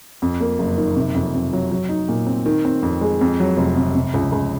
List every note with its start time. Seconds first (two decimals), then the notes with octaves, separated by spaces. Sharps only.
0.22 F2
0.40 A#3
0.59 F#1
0.77 D#3
0.96 C3
1.15 F2
1.34 F2
1.53 F#3
1.71 F#3
1.89 D#4
2.09 A#2
2.27 C4
2.46 D#3
2.65 C4
2.83 F2
3.01 G#3
3.21 F2
3.40 F#3
3.57 F1
3.77 C3
3.95 C3
4.14 C#2
4.32 C#2